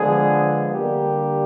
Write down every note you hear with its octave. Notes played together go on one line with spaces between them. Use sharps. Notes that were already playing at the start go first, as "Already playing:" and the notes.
Already playing: D3 F3 G#3 B3 G#4
D3 G3 A#3 G4